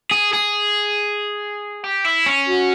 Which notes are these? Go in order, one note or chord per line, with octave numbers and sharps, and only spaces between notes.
G#4
G#4
G4
E4
C#4
F#4